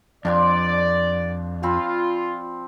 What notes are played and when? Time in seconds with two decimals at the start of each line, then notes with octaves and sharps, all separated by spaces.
0.25 F2 D4 D5 G5 C6
1.63 F3 C4 F4 B5